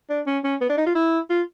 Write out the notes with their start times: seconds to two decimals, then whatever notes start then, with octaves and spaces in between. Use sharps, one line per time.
0.09 D4
0.27 C#4
0.44 C#4
0.61 B3
0.70 D4
0.78 D#4
0.86 F4
0.95 E4
1.30 F4